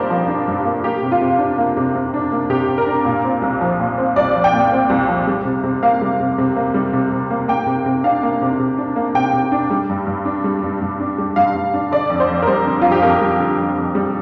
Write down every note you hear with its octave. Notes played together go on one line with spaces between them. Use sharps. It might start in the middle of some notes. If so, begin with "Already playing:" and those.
Already playing: G2 F3 A#3 D4 G4 A#4 C5 D5
F3
D4
G2
A#3
A#3 G4
C3
F4
C3
D4
A#3
C3
C3
D4
A#3
C3 G4
C3
A#4
D4
A#2
C4
C2
F3
A#2
C4
C2 D5
F3
G5
A#2
C4
C2
F3
G3
C3
C3
A#3 F5
G3
C3
C3
A#3
G3
C3
C3
A#3
A#3 G5
C3
C3
D4 F5
A#3
C3
C3
D4
A#3
C3 G5
C3
D4
G3
G2
G2
D4
G3
G2
G2
D4
G3
G2 F5
G2
D4
D3 D5
F2
C5
F2
A#4
G3 C5
D3
F2 F4
G4
F2 A#4
G3
D3
F2
F2
G3